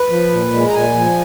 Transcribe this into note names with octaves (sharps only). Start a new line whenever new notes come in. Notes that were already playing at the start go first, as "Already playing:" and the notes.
Already playing: B4
F3
A#2
G#3
A#5
A#2 G#5
F3